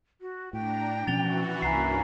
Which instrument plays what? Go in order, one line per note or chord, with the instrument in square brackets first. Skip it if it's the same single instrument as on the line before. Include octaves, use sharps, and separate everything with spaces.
[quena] F#4
[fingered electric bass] A2 [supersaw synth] D4 A#5 [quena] G5
[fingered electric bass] B2 F3 C#4 [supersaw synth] E3 F#4 [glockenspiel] A6 F7 G7
[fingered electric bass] C2 [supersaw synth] G2 A#3 C#4 [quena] E4 [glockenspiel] G#5 A#5 C7